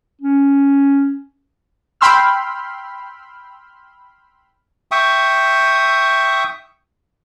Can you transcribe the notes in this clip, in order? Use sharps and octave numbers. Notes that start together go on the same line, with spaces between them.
C#4
G5 B5 C6 E6 F6
E5 G5 C#6 D#6